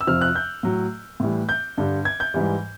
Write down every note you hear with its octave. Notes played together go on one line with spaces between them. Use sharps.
E6
F2 C3 F3 F6
F#6
G6
A2 F#3
A2 E3 G3
G6
G2 D3 G3
G#6
G6
G#2 E3 G3